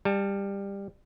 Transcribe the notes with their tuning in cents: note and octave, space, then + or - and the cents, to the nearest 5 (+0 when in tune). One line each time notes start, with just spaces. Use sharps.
G3 +20 A5 +0